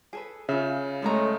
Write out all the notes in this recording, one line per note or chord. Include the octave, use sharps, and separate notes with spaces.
G#4 A4 B4
C#3 F4 E5
G#3 A3 A4 C#5 A#5